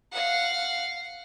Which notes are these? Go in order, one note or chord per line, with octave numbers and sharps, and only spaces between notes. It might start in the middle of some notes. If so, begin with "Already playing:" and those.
F5 F#5